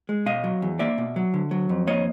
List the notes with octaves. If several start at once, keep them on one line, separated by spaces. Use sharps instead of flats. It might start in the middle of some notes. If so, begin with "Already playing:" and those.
G#3
B2 D#5 F5
F#3
E2
A#3 D5 E5
B2
F#3
D3
F#3
F2
A#3 C#5 D#5